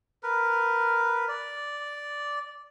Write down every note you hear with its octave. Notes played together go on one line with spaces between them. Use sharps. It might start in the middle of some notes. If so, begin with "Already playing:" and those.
A#4 B4
D5